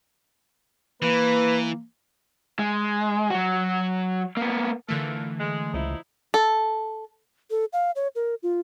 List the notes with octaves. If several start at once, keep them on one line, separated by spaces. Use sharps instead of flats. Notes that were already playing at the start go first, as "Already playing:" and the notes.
E3 A#3 B4
G#3
F#3 F#4
A#3 B3
D3 E3 A3 F4 A4 A#4
G#3
C#2 F3 D#4 E4
A4
A4
F5
C#5
A#4
F4